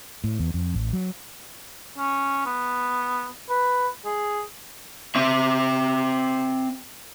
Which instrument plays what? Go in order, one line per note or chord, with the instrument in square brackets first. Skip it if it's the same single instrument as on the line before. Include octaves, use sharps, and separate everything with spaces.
[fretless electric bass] A2
E2
F2
A1
F#3
[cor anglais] C#4
B3
B4
G#4
[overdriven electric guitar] C4 E5